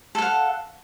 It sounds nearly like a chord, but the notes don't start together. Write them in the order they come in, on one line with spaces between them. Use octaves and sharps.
A4 F#5 F5